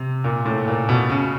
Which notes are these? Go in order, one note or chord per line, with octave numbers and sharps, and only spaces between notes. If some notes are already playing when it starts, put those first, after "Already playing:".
Already playing: C3
A#2
A2
A#2
B2
C#3